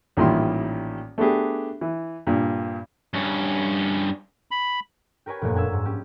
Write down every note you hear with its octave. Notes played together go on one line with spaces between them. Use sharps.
A1 A#2 D#3 G3 E4 C6
A3 B3 D4 G4 G#4
E3
G2 A#2
G2 C#4
B5
G4 A#4 B4 C#5 G#5
F1 F#2 A#2 A#3 C#5
D4 G#5 B5 E6 E7
G#2
C#4 G4